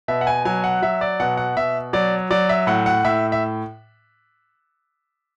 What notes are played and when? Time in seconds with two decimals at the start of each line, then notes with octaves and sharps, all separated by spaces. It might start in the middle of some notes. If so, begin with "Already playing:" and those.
0.08 B2 E5
0.21 F#5
0.27 G#5
0.45 F#3 G#5
0.64 F#5
0.82 F#3 E5
1.01 D5
1.20 B2 F#5
1.37 F#5
1.57 B2 E5
1.93 F#3 D5
2.31 F#3 D5
2.49 E5
2.67 A2 F#5
2.86 F#5
3.05 A2 E5
3.32 E5